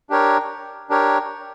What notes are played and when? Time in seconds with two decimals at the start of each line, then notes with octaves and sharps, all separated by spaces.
0.10 D4 G4 A#4 C#5
0.90 D4 G4 A#4 C#5